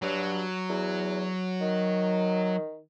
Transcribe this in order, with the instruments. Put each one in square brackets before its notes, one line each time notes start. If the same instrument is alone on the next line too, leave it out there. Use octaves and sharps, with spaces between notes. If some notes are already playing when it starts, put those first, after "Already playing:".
[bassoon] G2 [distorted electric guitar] F#3
[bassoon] E2
D#3